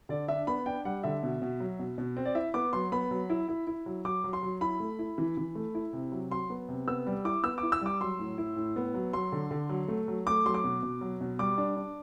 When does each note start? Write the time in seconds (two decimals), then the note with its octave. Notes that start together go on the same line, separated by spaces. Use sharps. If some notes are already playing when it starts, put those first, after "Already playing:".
0.09 D3 D5
0.28 D4 E5
0.47 B3 B5
0.66 D4 G5
0.85 G3 F#5
1.03 D3 E5
1.23 B2
1.42 B2
1.60 F#3
1.79 B2
1.98 B2
2.17 C4
2.25 D5
2.35 E4 E5
2.54 B3 D6
2.73 F#3 C6
2.92 B3 B5
3.11 F#3
3.30 E4
3.48 E4
3.67 E4
3.86 F#3
4.05 F#3 D6
4.24 F#3
4.33 C6
4.43 F#3
4.61 E4 B5
4.80 A3
4.99 E4
5.18 E3
5.37 E3
5.55 A3
5.75 E4
5.93 C3
6.12 F#3
6.31 F#3 C6
6.50 B3
6.68 C3
6.87 B3 E6
7.07 G3
7.25 E4 D6
7.43 B3 E6
7.58 D6
7.63 E4
7.72 E6
7.81 G3 D6
8.01 F#3 C6
8.19 A2
8.38 E4
8.56 A2
8.76 B3
8.94 F#3
9.13 F#3 C6
9.32 D3
9.51 D3
9.69 F#3
9.88 A3
10.08 F#3
10.27 A3 D6
10.45 F#3 C6
10.54 D6
10.64 B2
10.83 B2
11.01 F#3
11.21 B2
11.39 G3 D6
11.58 D4
11.77 D4